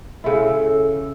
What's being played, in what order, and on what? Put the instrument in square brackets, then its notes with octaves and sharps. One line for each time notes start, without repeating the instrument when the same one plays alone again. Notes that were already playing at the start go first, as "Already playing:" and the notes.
[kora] C#3 E4 [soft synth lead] A4